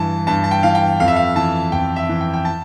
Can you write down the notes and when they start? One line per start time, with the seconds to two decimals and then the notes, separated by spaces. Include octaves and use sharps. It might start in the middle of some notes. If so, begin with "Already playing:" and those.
Already playing: G2 E3 A5
0.27 G2 A5
0.44 A5
0.51 G5
0.63 E3 F5
0.75 G5
1.00 F2 F5
1.08 E5
1.16 F5
1.36 E3 A5
1.72 F2 G5
1.96 E5
2.09 E3
2.21 G5
2.34 G5
2.45 A5